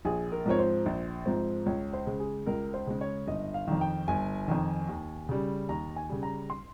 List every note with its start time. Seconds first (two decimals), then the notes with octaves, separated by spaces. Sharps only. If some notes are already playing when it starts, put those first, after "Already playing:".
0.05 A#1 G#4
0.32 A#4
0.46 G#2 F3 C4 C#5
0.59 C5
0.86 A#1
1.26 G#2 F3 C4
1.66 C#2 C#5
1.93 C5
2.07 C#3 G#3
2.20 G#4
2.46 C#2 A#4
2.74 C5
2.87 C#3 G#3
3.01 C#5
3.27 G1 D#5
3.54 F5
3.67 F2 D#3
3.81 G5
4.08 G1 G#5
4.48 F2 D#3
4.89 D#2
5.29 C#3 G3
5.69 D#2 A#5
5.96 G#5
6.09 C#3 G3
6.23 A#5
6.50 C6